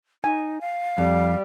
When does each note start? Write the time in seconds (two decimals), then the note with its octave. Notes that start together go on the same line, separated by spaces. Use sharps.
0.24 D#4 G#5
0.61 F5
0.98 F2 G3